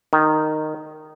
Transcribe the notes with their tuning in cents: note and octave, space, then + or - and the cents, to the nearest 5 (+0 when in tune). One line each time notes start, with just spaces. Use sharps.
D#3 -10